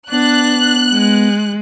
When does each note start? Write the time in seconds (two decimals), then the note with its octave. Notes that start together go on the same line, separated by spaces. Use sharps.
0.12 B3 D4 F#6
0.93 G#3